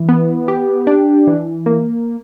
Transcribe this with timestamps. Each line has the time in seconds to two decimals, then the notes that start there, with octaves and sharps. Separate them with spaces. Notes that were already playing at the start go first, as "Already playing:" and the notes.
Already playing: E3
0.09 B3
0.48 G4
0.87 D4
1.27 E3
1.66 A#3